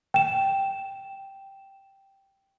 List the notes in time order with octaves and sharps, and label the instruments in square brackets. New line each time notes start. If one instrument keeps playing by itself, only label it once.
[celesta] G5 E7